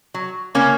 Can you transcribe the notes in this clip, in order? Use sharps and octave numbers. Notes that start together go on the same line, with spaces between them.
F#3
C#3 A#3 C#4